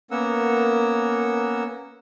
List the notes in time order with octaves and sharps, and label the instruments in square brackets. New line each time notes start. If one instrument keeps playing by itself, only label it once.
[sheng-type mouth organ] A#3 B3 C#4 A#4 F#5 E6